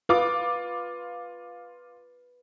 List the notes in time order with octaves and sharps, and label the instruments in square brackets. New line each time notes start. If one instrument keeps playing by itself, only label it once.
[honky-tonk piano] F4 D6 [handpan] B4